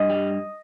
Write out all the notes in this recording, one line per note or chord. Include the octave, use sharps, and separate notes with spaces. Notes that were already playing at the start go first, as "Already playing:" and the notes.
Already playing: G2 D#5
G3